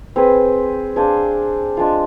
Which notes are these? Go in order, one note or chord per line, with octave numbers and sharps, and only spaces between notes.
C4 G#4 B4
D4 G#4 C5 F5
G#3 D4 F4